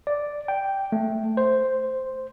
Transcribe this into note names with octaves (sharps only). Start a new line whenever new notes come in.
D5
G5
A3
C5